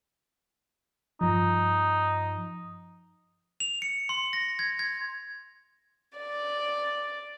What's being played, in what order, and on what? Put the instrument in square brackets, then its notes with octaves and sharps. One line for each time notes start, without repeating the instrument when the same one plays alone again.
[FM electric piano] G2 F3 [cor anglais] D#4
[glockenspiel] F7
C#7
C6
A#6
G#6
G#6
[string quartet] D5